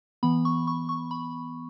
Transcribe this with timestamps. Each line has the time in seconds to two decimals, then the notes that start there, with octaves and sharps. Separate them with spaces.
0.23 E3 B3 B5
0.45 C#6
0.67 C#6
0.89 C#6
1.11 B5